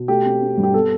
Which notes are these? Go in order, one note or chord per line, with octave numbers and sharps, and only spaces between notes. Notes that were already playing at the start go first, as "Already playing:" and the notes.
Already playing: B2
A3 G4
C4
C4
G2
G4
B3 A4